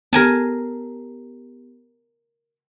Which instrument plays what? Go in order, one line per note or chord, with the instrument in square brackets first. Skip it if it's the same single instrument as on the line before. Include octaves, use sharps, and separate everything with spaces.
[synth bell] B3 G4 [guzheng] A#4 G#5 A5